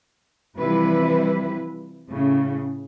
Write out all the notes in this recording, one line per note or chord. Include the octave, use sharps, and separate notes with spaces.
C3 E3 F3 G3 E4 B4
A2 C#3